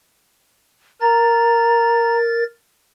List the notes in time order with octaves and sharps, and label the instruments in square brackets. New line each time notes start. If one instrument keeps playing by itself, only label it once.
[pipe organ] A#4 A6 [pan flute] A#5